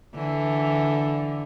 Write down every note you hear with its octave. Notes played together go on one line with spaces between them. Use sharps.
D3 E3